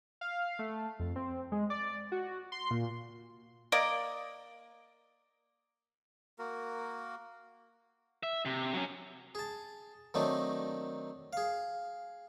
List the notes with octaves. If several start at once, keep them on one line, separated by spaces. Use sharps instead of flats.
F5
A3
F2
C4
G#3
D5
F#4
C6
A#2
A#3 A#4 D5 D#5
A#3 F#4 A#4
E5
C3
F#3 C#4
G#4 A5
D#3 F#3 A3 C4 D4 D#4
G#4 F5